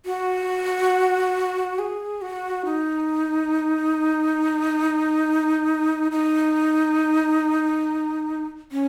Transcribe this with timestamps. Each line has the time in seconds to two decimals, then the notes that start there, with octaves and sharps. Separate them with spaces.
0.06 F#4
1.79 G#4
2.22 F#4
2.65 D#4
6.12 D#4
8.72 C#4